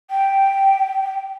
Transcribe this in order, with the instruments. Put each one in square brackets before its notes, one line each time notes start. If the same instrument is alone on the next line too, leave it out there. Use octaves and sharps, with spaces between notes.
[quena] G5